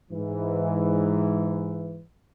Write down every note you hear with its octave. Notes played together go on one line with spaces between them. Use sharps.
G#2 E3